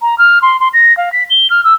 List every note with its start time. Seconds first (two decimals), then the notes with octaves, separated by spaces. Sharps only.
0.02 A#5
0.18 F6
0.42 C6
0.60 C6
0.74 A#6
0.97 F5
1.12 B6
1.30 G7
1.50 F6
1.64 E6